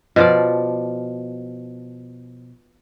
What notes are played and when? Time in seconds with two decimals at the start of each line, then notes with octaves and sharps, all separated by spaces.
0.16 B2 F3 D5